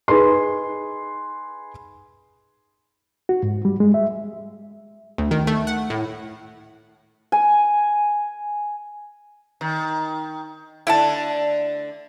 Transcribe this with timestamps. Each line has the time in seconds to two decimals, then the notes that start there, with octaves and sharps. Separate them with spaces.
0.08 D#4 G#4 B4 C6
3.29 F#4
3.43 G#2
3.65 G3
3.80 G#3
3.94 E5
5.18 D2
5.31 D#3
5.47 A3
5.67 F#5
5.90 A2
7.32 G#5
9.61 D#3
10.87 D3 A3 E4 F#5 A5